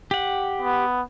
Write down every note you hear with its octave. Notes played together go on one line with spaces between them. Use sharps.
G4 F#5
B3